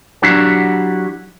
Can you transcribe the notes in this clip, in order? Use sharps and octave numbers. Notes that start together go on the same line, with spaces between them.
F#3 D4 E4 F#4 G4 F#5